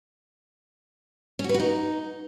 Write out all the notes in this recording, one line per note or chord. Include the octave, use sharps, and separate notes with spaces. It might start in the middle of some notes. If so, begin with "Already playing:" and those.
C#4
F#4
B4
F#4
D#4